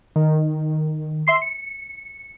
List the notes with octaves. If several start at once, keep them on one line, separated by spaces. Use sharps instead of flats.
D#3
E5 C6 C7
C#7